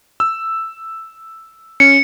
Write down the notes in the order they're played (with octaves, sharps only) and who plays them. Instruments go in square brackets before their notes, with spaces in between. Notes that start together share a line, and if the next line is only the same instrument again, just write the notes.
[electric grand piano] E6
[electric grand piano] C#4 [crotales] C#7